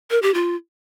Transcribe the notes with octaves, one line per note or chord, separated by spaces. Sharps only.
A#4
G4
F4